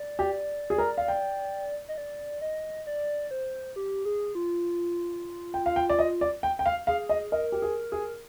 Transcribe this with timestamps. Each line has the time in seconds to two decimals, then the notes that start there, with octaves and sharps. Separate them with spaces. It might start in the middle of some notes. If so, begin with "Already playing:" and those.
Already playing: D5
0.19 G4
0.70 G#4
0.78 A#4
0.98 F5
1.08 G5
1.88 D#5
1.98 D5
2.41 D#5
2.87 D5
3.31 C5
3.76 G4
4.05 G#4
4.35 F4
5.54 G5
5.66 F5
5.76 G5
5.89 D5
5.99 D#5
6.21 D5
6.43 G5
6.59 G5
6.66 F5
6.87 G#4 F5
7.09 D#5
7.32 A#4 D#5
7.52 G4
7.62 G#4
7.92 G#4